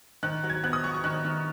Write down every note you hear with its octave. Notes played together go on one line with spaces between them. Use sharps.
D#3 F#6
F#3
G#6
B3 F#6
D#6
F#3 C#6
C#6
D#3 F#6
D#3